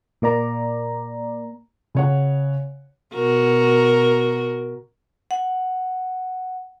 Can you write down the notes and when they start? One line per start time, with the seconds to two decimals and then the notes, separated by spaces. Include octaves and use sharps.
0.22 A#2 A#3 D5 A#5
1.95 C#3 C#5 F#5
3.14 B2 F#4 A#4
5.31 F#5